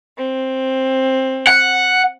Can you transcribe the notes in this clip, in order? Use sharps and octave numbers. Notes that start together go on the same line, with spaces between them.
C4
F#5